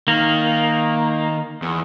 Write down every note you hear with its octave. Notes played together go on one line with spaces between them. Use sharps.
D#3 A#3
E2